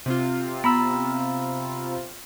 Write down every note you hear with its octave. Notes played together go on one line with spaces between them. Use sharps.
C3 C4 F4
B3 A#5 B5 E6